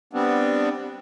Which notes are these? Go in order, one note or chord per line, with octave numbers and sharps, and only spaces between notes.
G3 B3 C4 D4